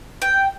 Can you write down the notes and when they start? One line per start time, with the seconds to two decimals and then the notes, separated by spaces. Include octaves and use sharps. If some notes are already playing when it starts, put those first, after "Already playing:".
0.22 G5